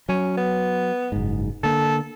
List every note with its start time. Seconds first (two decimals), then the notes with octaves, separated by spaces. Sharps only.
0.09 F#3 C#4
0.37 B3
1.12 F#1 G#2
1.63 D3 A#3 A4